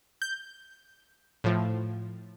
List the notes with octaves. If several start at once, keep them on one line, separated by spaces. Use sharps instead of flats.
G6
A2 F3